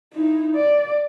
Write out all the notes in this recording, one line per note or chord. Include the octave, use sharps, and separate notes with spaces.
D#4 E4
D5